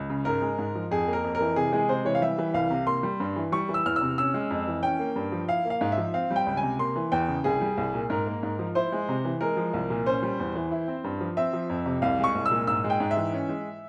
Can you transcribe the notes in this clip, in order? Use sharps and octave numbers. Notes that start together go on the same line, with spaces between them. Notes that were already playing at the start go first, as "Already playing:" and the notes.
Already playing: C#2
C#3
G#2 A#4
G#3
G#2
F3
F2 G#4
A#3
A#4
F2
A#4
E3
C3 G#4
G#3 G#4
C3 C5
E3 C#5
F5
G3 E5
E3
C2 F5
C3
A#3 C6
G3
G2
E3
G3 C#6
E3
E6
E2 F6
E6
C3
C#4 E6
G#3
F2
E3
C#4 G5
A#3
G2
F3
E4 F5
A#3
F5
G#2
E5
F3
C4 F5
G3
G5
C#2
G#5
C3
A#3 C6
E3
E2 G5
C#3
C2 G#4
G3
C2
A#2
G#2 A#4
A#3
G#2
F3
E4 C5
G#3
C3
E3
G#3 A#4
F3
C2
A#2
C#4 C5
G3
E2
E3
E4
C4
G2
F3
C4 E5
F3
F2
C3
C2 F5
G#3 C#6
C2
E6
A#2
G#2 E6
G#3
G5
G#2
E5
E3
C#4
G#3